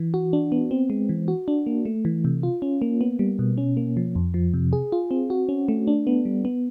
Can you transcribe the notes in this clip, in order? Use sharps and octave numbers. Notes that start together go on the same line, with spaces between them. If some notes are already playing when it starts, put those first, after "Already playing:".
Already playing: E3
F#4
D4
B3
C4
G#3
E3
F#4
D4
A#3
A3
E3
C3
F4
C#4
A#3
B3
G3
B2
C#4
A#3
F3
F2
F3
C3
G#4
F4
C4
F#4
C#4
A3
D4
B3
G3
B3